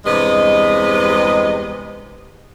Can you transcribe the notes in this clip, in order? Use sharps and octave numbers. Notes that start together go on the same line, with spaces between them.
E2 G2 C3 G#3 B4 D#5